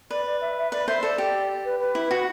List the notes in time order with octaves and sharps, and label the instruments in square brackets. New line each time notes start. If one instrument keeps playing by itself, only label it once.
[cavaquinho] B4 [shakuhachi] D5
[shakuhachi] D5
E5
E5
[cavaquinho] B4 [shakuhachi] D5
[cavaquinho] C5 [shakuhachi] E5
[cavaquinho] A4 [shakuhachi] D5
[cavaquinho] G4
[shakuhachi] B4
B4
[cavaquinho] E4
F#4